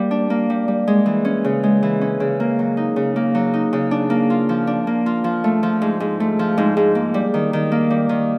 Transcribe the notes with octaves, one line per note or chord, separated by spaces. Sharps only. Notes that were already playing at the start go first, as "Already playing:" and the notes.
Already playing: G3 A#3
D4
A#3
G3
G3
G#3
E3
C#4
C#3
G#3
E3
C#4
C#3
A#3
F#3
D#4
C#3
A#3
F#3
D#4
C#3
D4
A#3
F4
F3
D4
A#3
F4
F3
A3
F3
G#2
G#2
A3
F3
G#2
G#2
A#3
G3
D#3
D#3
A#3
G3
D#3